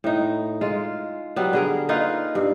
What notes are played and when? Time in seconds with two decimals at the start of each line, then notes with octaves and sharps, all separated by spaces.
0.04 A2 D#4
0.61 G#3 F4
1.36 F#3 G3 B3
1.53 D3 G#4 A#4
1.89 A#3 D#4 F4 B4
2.35 G2